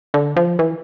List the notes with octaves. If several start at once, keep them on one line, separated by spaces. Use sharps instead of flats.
D3
F3
E3